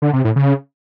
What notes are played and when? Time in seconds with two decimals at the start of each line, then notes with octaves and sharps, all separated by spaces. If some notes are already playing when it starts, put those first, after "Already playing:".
0.02 D3
0.13 C3
0.25 A2
0.36 C#3